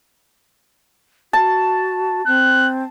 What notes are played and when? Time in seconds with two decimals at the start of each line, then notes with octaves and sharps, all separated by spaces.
1.33 F#4 A5
2.27 C4 F#6